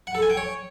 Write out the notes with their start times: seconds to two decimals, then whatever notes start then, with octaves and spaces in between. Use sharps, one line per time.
0.07 F#5
0.15 A4
0.22 G#5
0.30 G5
0.37 C#5